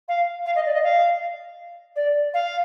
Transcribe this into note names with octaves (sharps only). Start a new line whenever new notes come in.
F5
F5
D#5
D5
D#5
F5
D5
F5